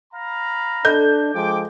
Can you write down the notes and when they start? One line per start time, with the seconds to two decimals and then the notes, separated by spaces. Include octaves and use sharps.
0.13 F5 A#5 B5
0.85 D4 A4 G6
1.34 F3 G#3 G5 D6